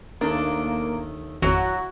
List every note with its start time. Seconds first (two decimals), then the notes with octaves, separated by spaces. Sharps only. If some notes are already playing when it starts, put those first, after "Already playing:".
0.21 D#2 A3 A#3 D4
1.42 G#1 F2 F#3 E4 F#4